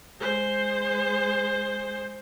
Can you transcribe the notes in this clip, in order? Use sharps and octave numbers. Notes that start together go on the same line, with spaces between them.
G#3 C5